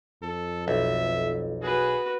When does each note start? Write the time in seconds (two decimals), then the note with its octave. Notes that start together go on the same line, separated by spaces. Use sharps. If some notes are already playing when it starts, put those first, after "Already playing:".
0.23 F2 A4
0.68 B1 E5
1.63 F#4 G#4 B4